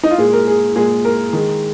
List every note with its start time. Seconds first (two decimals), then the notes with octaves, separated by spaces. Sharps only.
0.03 D#4
0.11 F4
0.18 A#2 G#3 G#4
0.33 A#4
0.47 G#4
0.76 A#2 G#3 G#4
1.05 A#4
1.33 D#3 G#3